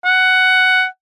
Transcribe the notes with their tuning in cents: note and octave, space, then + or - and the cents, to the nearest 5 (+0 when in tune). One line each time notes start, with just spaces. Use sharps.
F#5 +10